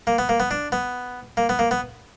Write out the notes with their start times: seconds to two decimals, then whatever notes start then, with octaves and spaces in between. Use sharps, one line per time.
0.07 A#3
0.18 B3
0.29 A#3
0.40 B3
0.51 D4
0.72 B3
1.37 A#3
1.49 B3
1.59 A#3
1.71 B3